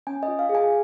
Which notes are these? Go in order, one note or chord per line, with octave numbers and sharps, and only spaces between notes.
C#4 G#5
D#5
F4
F5
G#4
G#5